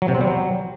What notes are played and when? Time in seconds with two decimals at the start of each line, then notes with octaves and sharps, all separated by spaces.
0.02 F#3
0.08 C3
0.15 C4
0.21 G3
0.27 F#3